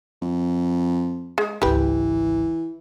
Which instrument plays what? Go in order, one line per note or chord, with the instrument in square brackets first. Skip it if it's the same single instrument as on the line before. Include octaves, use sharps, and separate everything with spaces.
[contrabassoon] F2
[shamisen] G#3
[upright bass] G#1 C#2 [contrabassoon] E3 [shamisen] G4 B4